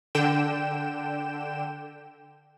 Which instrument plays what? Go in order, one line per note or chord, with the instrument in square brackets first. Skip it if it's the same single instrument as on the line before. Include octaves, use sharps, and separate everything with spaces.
[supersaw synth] D3 G5 E7